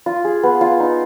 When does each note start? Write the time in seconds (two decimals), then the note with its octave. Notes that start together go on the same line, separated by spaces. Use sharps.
0.06 F4
0.25 G#4
0.43 B3
0.61 F4
0.80 D#4